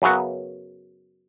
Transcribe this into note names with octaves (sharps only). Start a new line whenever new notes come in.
F#2 C#3 F#3 B3 F#4